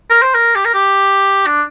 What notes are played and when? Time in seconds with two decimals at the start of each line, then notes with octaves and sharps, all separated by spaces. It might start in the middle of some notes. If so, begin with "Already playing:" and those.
0.10 A#4
0.22 C5
0.34 A#4
0.55 G4
0.65 A#4
0.74 G4
1.46 D4